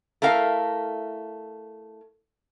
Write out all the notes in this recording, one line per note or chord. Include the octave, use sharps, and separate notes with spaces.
A3 E4 A#4 F5